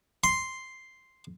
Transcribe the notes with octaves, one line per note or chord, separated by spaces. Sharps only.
C6